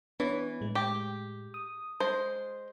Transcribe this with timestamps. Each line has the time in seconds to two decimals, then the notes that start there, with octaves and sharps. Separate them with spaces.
0.20 E3 B3 D4 C#5
0.61 A2 G#3
0.75 G4
1.54 D#6
2.00 G#3 C5